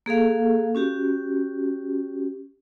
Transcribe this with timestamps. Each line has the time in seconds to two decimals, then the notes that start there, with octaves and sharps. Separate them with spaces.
0.06 A#3 G#4 A4 F5
0.75 C#4 F#4 G4